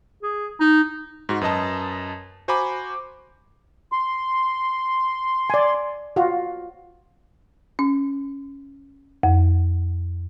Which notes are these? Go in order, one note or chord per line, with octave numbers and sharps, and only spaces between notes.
G#4
D#4
G#2 F#4
F#2 B4 D#5 A5
F#4 C5 G#5 A#5 B5 D6
C6
D5 G#5
F4 F#4
C#4
F2